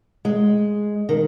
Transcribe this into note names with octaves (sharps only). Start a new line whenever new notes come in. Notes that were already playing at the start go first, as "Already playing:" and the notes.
G#3
D#3